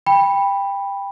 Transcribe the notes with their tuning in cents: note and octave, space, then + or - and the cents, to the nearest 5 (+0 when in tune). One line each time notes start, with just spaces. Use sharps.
G5 +20 B5 -5